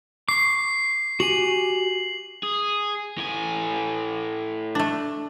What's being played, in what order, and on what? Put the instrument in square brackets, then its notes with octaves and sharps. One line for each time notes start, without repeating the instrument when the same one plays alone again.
[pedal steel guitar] C#6 D6 [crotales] C7
[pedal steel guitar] F#4 G4 G#5 [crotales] F#7
[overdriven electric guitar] G#4
A2 G#5
[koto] A3 D4